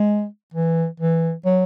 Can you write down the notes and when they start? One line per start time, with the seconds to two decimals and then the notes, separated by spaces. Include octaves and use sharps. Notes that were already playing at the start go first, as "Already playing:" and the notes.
Already playing: G#3
0.54 E3
1.00 E3
1.45 F#3